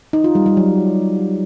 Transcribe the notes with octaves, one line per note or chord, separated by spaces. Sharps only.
D#4
F4
G3
G3
F#3